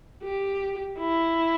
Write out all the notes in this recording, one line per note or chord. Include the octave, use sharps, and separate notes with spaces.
G4
E4